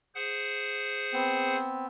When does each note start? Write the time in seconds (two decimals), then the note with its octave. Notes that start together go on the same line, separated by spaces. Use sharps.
0.15 G#4 C5 F#5
1.13 B3 C4